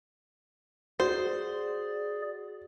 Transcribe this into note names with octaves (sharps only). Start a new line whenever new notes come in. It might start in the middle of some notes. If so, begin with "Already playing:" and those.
F#4 G#4 C5 D5